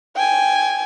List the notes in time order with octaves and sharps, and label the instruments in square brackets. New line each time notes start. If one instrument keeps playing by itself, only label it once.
[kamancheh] G5 G#5